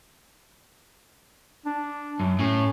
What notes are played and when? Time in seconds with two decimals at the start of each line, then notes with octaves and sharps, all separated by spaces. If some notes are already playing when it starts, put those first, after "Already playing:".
1.66 D4
2.20 F#2
2.39 A2 C#4